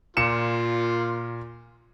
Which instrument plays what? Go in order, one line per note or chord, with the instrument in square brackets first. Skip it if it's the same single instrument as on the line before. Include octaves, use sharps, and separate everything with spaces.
[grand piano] A#2 C#7 E7 [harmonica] A#3 F4